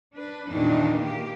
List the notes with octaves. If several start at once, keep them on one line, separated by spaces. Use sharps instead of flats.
D4 B4
E2 A#2 D#3 E3 D4 D#4
A#3 G4